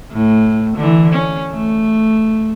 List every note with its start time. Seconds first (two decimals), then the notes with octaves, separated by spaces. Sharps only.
0.12 A2
0.76 D3 E3
1.13 C#4
1.51 A3